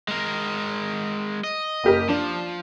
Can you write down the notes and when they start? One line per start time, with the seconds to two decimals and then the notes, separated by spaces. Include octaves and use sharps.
0.08 G#3 A#4
1.44 D#5
1.84 F#1 G4 A#4
2.09 F3 D4